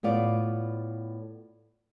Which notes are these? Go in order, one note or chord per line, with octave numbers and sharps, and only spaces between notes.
A2 B3 F4 D5